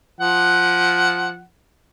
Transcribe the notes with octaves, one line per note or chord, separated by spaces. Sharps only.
F3 F#5